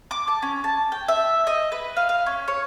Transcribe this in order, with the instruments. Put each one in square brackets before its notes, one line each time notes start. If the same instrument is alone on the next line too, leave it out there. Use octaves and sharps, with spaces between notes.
[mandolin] D6
A5
C#4
A5
G5
E5
D#5
B4
F5
F5
C#4
C#5